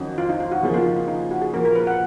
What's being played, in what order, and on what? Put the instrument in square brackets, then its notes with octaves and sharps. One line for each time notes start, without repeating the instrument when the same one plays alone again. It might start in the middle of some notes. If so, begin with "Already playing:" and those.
Already playing: [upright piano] F2 D#3 F#3 C#4 F#4
[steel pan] F4
D#4
F4
F#4
[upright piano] C#3 F3 A#3 [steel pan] G#4
[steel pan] F4
D#4
F4
D#4
F#4
G#4
[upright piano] A#2 F3 A#3 [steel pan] A#4
[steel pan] A#4
B4
F#5